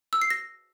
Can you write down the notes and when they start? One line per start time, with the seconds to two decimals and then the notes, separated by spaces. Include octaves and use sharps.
0.13 E6
0.22 C7
0.30 A#6